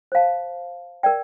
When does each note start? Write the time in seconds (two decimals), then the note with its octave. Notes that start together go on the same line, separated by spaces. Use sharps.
0.12 C5 F5 A5
1.03 A#4 D5 G5